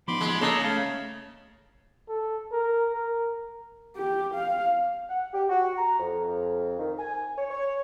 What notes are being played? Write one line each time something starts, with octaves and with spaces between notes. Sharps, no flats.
F3 B3 D#4 B5 C6 D6
G#3
C#3 A#3 A4 D#5 A#5
A3 F5 A5
A4
A#4
A#4
G4
F5
F#5
G4
F#4
A#5
F2
D#3
G#5
C#5
C#5